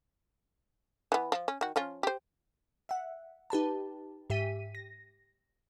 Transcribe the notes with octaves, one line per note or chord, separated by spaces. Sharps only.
E3 B3
F3
C#4
D#3 F#4
F3 C#4 F4
G4 C5
E5 F#5
D#4 G4 B4 A5
G#2 G4 E5 B6 D#7
A#6